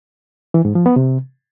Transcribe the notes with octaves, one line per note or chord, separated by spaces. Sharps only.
E3
G#2
F3
B3
C3